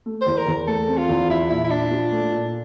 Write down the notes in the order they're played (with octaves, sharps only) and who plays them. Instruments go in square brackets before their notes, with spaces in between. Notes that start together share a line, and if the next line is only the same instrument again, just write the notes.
[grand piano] A3
[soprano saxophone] C5
[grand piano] E2
[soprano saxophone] A#4
[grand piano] E2
[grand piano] A3 [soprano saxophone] A4
[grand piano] C4
[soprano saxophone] F4
[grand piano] E2
[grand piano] F3 [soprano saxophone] E4
[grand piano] A#2 [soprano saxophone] E4
[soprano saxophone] E4
[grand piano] A#2 [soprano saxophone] D4
[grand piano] F3
A3
A#2